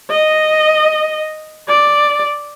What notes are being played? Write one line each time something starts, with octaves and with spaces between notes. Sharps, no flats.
D#5
D5